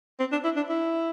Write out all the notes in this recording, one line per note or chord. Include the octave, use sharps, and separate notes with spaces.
C4
D4
E4
D4
E4